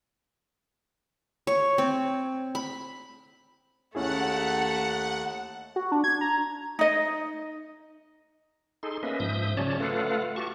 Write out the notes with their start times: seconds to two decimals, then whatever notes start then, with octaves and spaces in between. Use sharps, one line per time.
1.47 C#5
1.78 C4
2.55 B5
3.95 D#2 A3 C#4 E4 G#4 F#5
5.76 F#4
5.92 D4
6.04 G#6
6.21 A#5
6.79 D#4 D#5
8.83 D#4 G#4 A4 C6
9.03 A#3 C#4 B4 D#5 E5
9.20 G#2 F3 E5 D#6 G6
9.57 C#3 F#3 C#4 C#5 D5 A5
9.80 A3 F4 A4 B4 F5 F#5
10.36 F#4 G4 A5 C#6